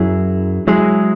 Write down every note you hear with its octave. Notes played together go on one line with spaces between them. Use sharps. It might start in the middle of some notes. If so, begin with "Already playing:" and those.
Already playing: F#2 F#3 E4 G#4
F#3 G#3 E4 G#4